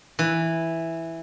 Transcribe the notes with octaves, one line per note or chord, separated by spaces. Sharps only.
E3